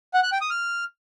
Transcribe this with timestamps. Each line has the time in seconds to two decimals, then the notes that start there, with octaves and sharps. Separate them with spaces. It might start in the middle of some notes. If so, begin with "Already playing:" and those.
0.14 F#5
0.23 F#6
0.32 G5
0.41 D#6
0.50 F6